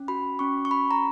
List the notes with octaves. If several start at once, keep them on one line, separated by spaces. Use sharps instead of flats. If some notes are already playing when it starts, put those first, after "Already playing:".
Already playing: C#4
F#4 B5
C#4 C#6
C#6
F#4 B5
A#5